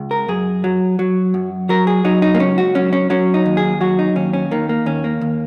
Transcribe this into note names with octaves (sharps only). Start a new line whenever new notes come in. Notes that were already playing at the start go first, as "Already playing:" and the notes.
Already playing: C#2
A#4
F#2 G#4
F#3
F#3
F#2
F#3 A#4
G#4
F#3 D#4
D#4
A#3
C#2 C#4
F#4
F#3 C#4
C#4
F#3 C#4
D#4
D#2
G#4
F#3 F#4
D#4
D#2 C#4
C#4
D#3 A#3
A#3
D#2 C#4
A#3
D#2